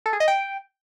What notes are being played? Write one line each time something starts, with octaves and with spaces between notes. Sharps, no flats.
A4
G#4
D#5
G5